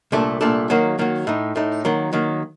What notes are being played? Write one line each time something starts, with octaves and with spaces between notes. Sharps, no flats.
C2 A#2 A3 D4 A4
C2 A#2 A3 D4 A4
D#3 F#3 A#3 F#4
D#3 F#3 A#3 F#4
A2 A3 D#4
A2 A3 D#4
D#3 F#3 A#3
D#3 F#3 A#3